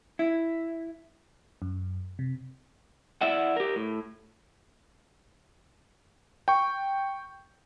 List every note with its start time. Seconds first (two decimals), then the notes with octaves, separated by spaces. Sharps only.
0.19 E4
1.62 F#2
2.19 C3
3.21 E4 D5 E5 F#5
3.56 G4 A#4
3.76 A2
6.48 G5 C#6